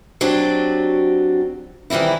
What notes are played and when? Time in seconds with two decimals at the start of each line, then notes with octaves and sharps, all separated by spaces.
0.21 F#3 C4 D4 F#4 G4
1.90 D#3 E3 G3 C4 E4